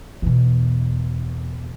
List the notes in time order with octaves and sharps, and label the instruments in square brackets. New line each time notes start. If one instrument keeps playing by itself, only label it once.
[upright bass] E2 B2